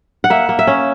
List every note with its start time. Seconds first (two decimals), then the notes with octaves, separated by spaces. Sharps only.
0.24 F#5
0.30 A#3 E5
0.49 A#3
0.59 E5
0.67 C#4